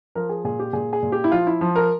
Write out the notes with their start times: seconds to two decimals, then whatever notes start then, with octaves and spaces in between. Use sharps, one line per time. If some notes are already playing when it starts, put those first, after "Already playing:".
0.15 F3 A#4
0.29 G#4
0.44 A#2 G#4
0.59 G4
0.73 A#2 G#4
0.93 G#4
1.03 A#2
1.12 G4
1.24 E4
1.32 F3 F4
1.47 E4
1.61 F3
1.75 A#4